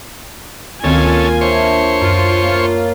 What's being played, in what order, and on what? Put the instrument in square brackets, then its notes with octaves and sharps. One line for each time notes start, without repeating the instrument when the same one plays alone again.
[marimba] D2 D#3 C4 [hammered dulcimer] A#2 [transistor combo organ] C#4 A4 [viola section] F4 G#5
[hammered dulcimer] D4 E5 [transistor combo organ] C5 C#5
[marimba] F#2 [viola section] F4
[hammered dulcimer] A#3 C#4